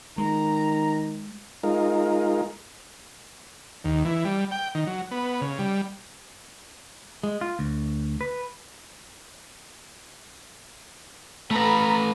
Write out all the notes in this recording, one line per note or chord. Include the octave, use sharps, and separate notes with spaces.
D#3 G#3 A#5
G#3 D#4 F4 A#4
D#2
E3
G3
G5
D#3
F#3
B3
C#3
G3
G#3
F4
D2
B4
A3 A4 B4 A#5 B5